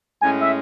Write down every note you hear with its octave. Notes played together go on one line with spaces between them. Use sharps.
A2 G#3 C#4 G#5
E5